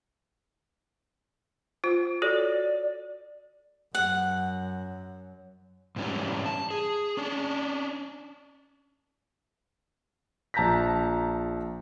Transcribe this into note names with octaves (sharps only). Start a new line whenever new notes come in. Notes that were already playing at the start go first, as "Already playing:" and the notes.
F4 C5
F#4 A4 C#5 D5
F#2 F#5
G#2 E3 G3 C#4 D4
A5
G#4
C#4 D4
A#1 A5 A#5 G6 A#6 B6